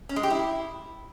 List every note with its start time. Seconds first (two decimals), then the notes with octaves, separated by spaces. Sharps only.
0.09 C#4
0.16 G#3
0.23 G4
0.30 E4